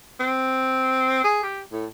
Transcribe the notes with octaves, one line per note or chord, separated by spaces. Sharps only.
C4
G#4
G4
A2